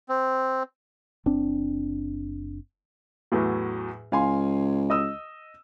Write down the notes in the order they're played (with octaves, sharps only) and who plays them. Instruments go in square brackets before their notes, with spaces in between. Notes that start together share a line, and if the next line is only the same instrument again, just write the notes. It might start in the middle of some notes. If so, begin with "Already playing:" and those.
[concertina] C4
[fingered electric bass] F#1 C4 D4
[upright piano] E2 A2 F#3
[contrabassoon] C#2 [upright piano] F5 G#5 C6
[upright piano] D#5 D#6 E6